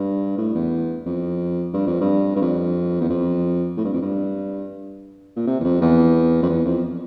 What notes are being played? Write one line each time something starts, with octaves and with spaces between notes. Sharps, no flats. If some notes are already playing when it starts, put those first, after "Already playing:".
Already playing: G2
A2
E2
F2
G2
F2
G2
G2
F2
E2
F2
A2
G2
F2
G2
A#2
C3
E2
F2
E2
F2
E2
F2